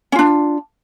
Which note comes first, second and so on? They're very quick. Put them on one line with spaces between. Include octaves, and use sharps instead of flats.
C#4 F4 D4